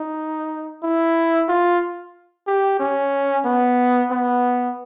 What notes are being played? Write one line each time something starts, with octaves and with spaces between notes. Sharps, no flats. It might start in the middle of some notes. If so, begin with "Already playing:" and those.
Already playing: D#4
E4
F4
G4
C#4
B3
B3